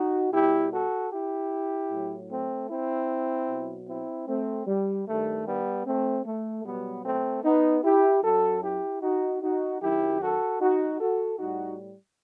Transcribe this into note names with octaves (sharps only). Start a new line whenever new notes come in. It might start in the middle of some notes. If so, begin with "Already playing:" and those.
Already playing: D#4 F#4
B2 G3 E4 G4
F#4 A4
E4 G4
A2 F#3
A3 C4
C4 E4
B2 F#3
C4 E4
A3 C4
G3
G2 D#3 G3 A3
G3 B3
A3 C4
A3
B2 F#3 G3 B3
A3 C4
B3 D#4
E4 G4
F#2 F#3 F#4 A4
E4 G4
D#4 F#4
D#4 F#4
F#2 D#3 F#3 E4 G4
F#4 A4
D#4 F#4
F#4 A4
A2 G3 D#4 F#4